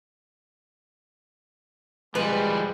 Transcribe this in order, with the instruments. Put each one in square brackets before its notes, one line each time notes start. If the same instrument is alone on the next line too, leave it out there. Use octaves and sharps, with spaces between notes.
[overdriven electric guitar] F3 G3 [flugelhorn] G#3 [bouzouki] B4